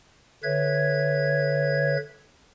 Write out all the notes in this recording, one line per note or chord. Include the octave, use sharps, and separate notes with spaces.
D3 B4 C#5 E5 G#6